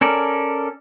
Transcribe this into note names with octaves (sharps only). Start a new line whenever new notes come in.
C#4 A4 A#4 D5